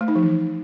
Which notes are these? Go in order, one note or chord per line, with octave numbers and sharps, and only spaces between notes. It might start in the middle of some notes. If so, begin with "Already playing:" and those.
A3
D#4
F3
E3